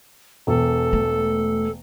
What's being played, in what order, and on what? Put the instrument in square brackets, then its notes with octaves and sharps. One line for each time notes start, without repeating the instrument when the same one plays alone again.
[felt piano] E1 [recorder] A4
[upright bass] A3